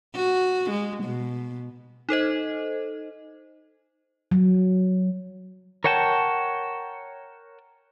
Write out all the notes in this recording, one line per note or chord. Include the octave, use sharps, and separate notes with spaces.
F#4
G#3
B2
D#4 A4 C5 D#5
F#3
A#4 C#5 F#5 G5 A5